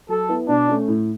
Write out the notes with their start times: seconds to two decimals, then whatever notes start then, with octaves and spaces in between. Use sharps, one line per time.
0.09 F#3 A4
0.29 B3 E4
0.48 B2 D4
0.68 A3 C#4
0.88 A2